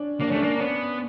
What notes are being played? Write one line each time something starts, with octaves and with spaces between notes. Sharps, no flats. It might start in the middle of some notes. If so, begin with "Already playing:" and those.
Already playing: C#4 D4
A#3 D4
C#4
A3 D4
A#3
D4
B3 C#4